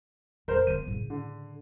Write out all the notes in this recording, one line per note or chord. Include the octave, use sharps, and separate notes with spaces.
F2 A#4 C5
D3 B3 D#7
A2 C#3
D3